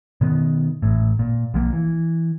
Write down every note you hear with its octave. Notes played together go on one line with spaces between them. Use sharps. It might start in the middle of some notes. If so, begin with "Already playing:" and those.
B2 D#3 B3
A1 A2
A#2
B1 F3 A#3
E3